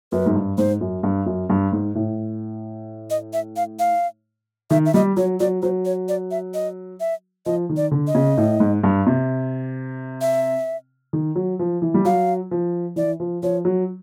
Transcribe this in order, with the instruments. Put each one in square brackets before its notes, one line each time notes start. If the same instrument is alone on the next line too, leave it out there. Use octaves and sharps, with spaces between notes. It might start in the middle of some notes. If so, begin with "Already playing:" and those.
[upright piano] F#2 [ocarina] B4
[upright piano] G#2
G2
[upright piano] G#2 [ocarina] C5
[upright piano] F#2
G2
F#2
G2
G#2
A2
[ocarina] D#5
E5
F5
F5
[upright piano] D#3 [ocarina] E5
[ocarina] E5
[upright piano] G3 [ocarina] D#5
[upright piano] F#3 [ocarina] C#5
[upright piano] F#3 [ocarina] D5
[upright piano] F#3 [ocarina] C5
[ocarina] C#5
D5
E5
D#5
E5
[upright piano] F3 [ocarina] D#5
[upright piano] D#3
[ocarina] D5
[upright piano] D3
[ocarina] D#5
[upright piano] C#3
A2
G#2
G2
C3
[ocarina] E5
[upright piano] D#3
F#3
F3
E3
G3
[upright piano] F#3 [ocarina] F5
[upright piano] F3
[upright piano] E3 [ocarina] D5
[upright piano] F3
[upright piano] F3 [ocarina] C#5
[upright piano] F#3